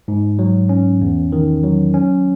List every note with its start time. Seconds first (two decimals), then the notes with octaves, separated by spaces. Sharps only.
0.08 G#2
0.39 F#3
0.69 C#4
1.02 E2
1.32 D#3
1.64 F#3
1.94 C#4